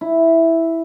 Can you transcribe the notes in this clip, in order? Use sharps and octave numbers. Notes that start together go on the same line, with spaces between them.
E4